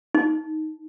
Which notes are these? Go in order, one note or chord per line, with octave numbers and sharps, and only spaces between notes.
D#4